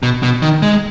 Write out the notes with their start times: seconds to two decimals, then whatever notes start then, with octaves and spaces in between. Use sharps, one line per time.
0.03 B2
0.23 B2
0.42 D#3
0.62 G#3